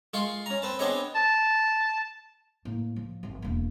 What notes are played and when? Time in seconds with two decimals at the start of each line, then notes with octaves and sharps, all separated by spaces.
0.14 G#3 F4 C6 C#6
0.46 C#4 A#5
0.62 C4 B4 A5
0.79 B3 C4 D4 G#4 C#5 D#5
1.15 A5
2.65 A2 A#3
2.96 F3
3.23 G#1 F3
3.42 E1 A#3